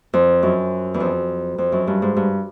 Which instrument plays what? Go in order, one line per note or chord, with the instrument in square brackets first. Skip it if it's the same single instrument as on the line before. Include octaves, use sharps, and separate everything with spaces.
[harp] F2
F#2
E2
F2
F2
F#2
G2
G#2
G2